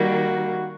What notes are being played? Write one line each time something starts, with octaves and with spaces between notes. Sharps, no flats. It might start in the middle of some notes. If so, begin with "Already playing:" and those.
Already playing: D#3 G3 A#3 F#4